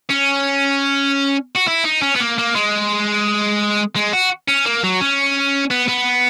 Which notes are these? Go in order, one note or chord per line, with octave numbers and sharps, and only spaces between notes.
C#4
F#4
E4
D#4
C#4
B3
A#3
A#3
G#3
G#3
F#4
C#4
A#3
F#3
C#4
B3
B3